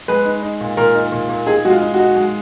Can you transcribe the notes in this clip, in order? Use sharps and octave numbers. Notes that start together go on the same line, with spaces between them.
G#3 B4
D#4
D#4
A#2
A#2 A#4
D#4
A#2
A#2
D#4 G#4
G#3 F#4
F4
D#4
F#4
D#4
G#3